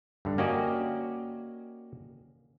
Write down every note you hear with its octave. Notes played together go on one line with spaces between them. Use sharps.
G2 D3
A#3 C#4 F#4 G4 D5 D#5